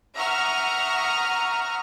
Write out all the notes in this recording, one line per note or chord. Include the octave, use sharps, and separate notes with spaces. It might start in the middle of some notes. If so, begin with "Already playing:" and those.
E5 F#5 A#5 C#6 D#6 F6